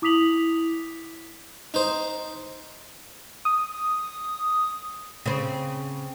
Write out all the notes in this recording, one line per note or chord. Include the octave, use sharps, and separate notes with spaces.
E4 D6 D#6 B6 F7 F#7
D#4 C5
D#6
C#3 C4